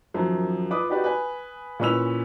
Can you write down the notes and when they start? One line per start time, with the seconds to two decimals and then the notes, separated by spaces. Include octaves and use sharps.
0.14 F#2 D#3 F3 F#3
0.70 F4 B4 D6 D#6
0.89 D#4 F#4 G4 B4 D5
1.04 B4 G#5
1.80 A#2 E3 C#4 B4 E6 F7